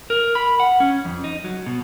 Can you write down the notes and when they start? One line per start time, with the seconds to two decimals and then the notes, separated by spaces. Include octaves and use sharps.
0.10 A#4
0.35 B5
0.60 F#5
0.80 C#4
1.05 F2
1.24 D#4
1.44 F#3
1.66 B2